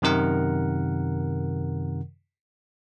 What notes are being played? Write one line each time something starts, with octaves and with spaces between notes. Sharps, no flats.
F#2 C3 D#3 A#4 F#5